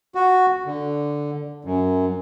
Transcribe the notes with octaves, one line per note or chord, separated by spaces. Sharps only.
F#4
D3
F#2